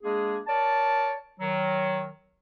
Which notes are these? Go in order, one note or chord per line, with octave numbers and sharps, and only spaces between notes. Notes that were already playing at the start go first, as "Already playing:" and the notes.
G#3 A#3 D4 G#4
A#4 C#5 D5 A5
D#3 F#3